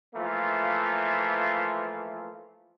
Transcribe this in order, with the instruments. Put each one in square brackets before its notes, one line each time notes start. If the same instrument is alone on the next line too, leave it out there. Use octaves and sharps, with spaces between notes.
[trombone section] E3 F3 A3 A#3 F4